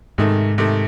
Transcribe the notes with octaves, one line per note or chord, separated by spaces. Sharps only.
G#2 C3 D#3 A3
C3 D#3 A3